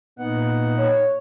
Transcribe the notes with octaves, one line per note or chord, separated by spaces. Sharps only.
A#2 B3 D#4 F#5
C#5